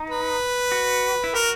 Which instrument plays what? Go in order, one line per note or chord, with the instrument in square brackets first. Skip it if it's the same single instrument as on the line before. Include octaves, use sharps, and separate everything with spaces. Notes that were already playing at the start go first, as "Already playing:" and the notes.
Already playing: [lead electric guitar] D#4
[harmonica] B4
[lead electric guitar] F#4
E4
[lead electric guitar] F#4 [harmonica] A#4